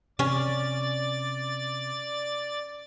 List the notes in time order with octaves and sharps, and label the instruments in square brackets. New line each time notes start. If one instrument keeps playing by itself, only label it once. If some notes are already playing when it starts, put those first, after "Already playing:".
[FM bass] C3 [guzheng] C#4 [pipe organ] D5 A6